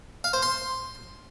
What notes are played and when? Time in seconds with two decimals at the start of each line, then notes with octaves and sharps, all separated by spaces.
0.24 F5
0.33 C5
0.43 C6